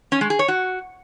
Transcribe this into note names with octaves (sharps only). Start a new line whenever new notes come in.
C#4
G#3
G#4
C#5
F#4